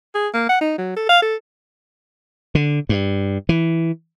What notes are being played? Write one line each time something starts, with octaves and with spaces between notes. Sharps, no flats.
G#4
A#3
F#5
D#4
F#3
A4
F5
A4
D3
G2
E3